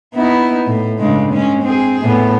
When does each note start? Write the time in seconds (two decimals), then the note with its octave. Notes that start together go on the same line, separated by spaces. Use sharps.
0.15 B3 D#4 E4
0.67 A2
0.98 G2 C#3 G#3
1.31 G#3 C#4
1.62 C4 G#4
2.02 A2 B3